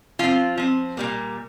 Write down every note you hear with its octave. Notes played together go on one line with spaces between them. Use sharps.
F3 C4 F4
F3 C4
A#2 G3 A#3